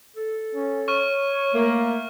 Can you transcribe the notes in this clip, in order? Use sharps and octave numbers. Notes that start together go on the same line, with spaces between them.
A4
C#4
C#5 C#6 F6 D#7
A3 A#3